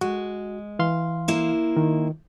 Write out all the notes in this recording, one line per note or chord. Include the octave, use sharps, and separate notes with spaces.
G#3 F#4
E3 F5 C6
A#3 E4 C5
D#3